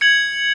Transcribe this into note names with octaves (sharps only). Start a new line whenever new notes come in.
G#6 C#7 F#7